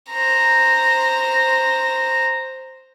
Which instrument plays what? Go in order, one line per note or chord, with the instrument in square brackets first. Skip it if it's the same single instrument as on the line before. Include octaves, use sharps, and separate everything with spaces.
[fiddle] C5 A#5